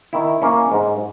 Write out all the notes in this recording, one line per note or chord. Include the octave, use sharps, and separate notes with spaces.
D#3 E4
A#3 C#4
G#2